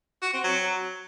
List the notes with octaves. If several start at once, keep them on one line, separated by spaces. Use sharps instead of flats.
F#4
C4
F#3